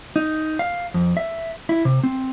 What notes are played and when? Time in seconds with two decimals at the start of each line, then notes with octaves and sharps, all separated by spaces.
0.16 D#4
0.59 F5
0.94 F2
1.17 E5
1.69 E4
1.85 C3
2.03 C4